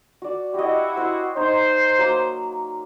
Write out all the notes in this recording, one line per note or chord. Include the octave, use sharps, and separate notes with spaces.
F#4 D5
E4 F#4 G4 D#5
C5 C6
D#4 C5 F#5
F#3 A#3